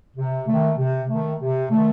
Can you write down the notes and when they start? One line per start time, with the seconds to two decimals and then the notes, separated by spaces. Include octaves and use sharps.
0.17 C3
0.48 D#3 A3
0.78 C3
1.09 D#3 A3
1.41 C3
1.71 D#3 A3